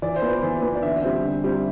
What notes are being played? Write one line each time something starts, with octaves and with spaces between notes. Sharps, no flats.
E3 D5
C5
B3
B4
E3 C5
B3
D5
D3 E5
G3 C4
D3
G3 C4